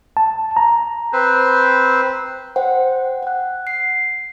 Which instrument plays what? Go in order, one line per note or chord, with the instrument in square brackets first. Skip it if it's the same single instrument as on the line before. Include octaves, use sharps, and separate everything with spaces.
[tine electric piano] A5
A#5
[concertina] C4 B4 C5
[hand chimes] C5 F#5 G5
F#5 F#6
C7